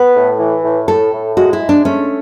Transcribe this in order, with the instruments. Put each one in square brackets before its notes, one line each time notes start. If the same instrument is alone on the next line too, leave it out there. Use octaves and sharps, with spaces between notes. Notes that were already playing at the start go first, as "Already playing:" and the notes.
Already playing: [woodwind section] B3 [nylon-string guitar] B4
[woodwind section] A2
E3
A2
[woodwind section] A2 [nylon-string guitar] A4
[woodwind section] A2
[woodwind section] G#3 [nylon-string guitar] F#4
[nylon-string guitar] E4
[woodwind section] G#3
[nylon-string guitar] D4
[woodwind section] A3 [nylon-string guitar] C#4